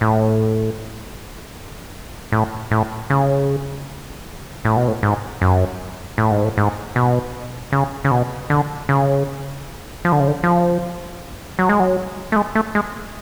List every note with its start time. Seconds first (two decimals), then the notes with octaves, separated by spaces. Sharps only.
0.01 A2
2.32 A2
2.71 A2
3.10 C#3
4.65 A2
4.77 B2
4.88 A2
5.03 G#2
5.42 F#2
6.18 A2
6.31 G#2
6.44 A2
6.57 G#2
6.96 B2
7.72 C#3
8.04 C#3
8.11 B2
8.50 D3
8.89 C#3
10.05 F3
10.12 D3
10.20 C#3
10.28 D3
10.43 F3
11.59 F#3
11.69 G#3
11.80 F#3
12.32 A3
12.36 G#3
12.55 A3
12.75 G#3